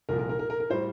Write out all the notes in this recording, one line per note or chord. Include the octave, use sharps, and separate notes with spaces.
C2 A#2 F3 A#4
A#4
A#4
A#4
A#4
A#4
A2 G3 C5